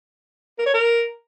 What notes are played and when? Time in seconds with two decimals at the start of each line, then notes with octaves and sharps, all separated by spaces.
0.58 A#4
0.66 C#5
0.74 A#4